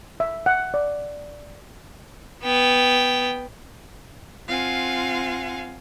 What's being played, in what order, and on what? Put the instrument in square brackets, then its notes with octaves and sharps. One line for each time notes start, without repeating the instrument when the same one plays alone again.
[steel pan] E5
F#5
D5
[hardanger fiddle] B3 G5
[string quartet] C4 F4 F5 F#5 G#5